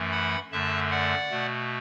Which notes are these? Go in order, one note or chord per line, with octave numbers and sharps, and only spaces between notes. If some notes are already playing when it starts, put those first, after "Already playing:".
Already playing: F#2 E3 A3
F#5 B5
F#2 D3 A3 E5 A5
D5 F#5
B2 A3